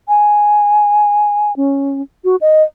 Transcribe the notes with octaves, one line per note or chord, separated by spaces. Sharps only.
G#5
C#4
F#4
D#5